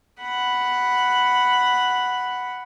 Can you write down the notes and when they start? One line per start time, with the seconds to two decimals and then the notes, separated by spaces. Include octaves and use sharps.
0.21 F#5 B5